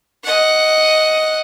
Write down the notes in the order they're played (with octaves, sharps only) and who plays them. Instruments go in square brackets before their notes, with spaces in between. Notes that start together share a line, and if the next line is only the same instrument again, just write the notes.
[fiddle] D#5 F#5